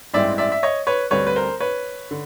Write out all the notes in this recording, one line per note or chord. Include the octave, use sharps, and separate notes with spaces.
A1 G2 E3 G#3 C4 D5 E5
D5 E5
E5
C#5 D#5
B4 C#5
D2 D3 G3 C4 B4 C#5
B4
A#4 C5
B4 C#5
D3